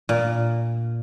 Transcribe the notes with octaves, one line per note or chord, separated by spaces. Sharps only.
A#2